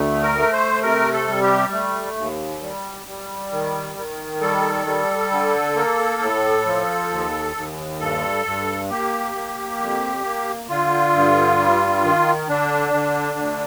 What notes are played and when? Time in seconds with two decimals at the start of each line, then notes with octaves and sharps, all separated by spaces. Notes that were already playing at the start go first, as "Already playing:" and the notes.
Already playing: D2 A3
0.23 A#4
0.38 A3
0.53 C5
0.83 C3 A#4
1.13 A4
1.27 G3
1.42 G4
1.72 A3
2.17 D#2
2.62 G3
3.07 G3
3.52 D#3
3.97 D#3
4.41 G3 A4
4.87 G3
5.32 D3
5.76 A#3
6.21 A2
6.66 F3
7.11 D#2
7.56 D#2
8.00 G2 A4
8.46 G2
8.90 A#3 G4
9.35 A#3
9.79 F2
10.25 A#3
10.69 D3 F4
11.14 G2
11.59 G3
12.04 D#3
12.49 D3 D4
12.93 D3
13.39 D2